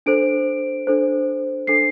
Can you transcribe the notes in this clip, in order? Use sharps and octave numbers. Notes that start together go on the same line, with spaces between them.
D4 A4 C5 D7
D4 A4 C5
D4 A4 C5 C7